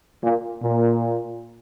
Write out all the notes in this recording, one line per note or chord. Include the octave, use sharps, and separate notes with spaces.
A#2
A#2